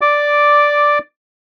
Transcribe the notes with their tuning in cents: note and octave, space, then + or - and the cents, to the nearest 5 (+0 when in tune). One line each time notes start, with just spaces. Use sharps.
D5 +0 D6 +0